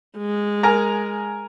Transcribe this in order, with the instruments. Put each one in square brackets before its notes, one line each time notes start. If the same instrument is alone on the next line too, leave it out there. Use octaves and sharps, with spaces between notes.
[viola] G#3
[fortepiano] A#4 G#5 A#5